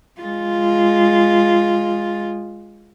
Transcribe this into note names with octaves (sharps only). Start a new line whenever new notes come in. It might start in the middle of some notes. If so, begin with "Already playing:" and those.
G#3 F4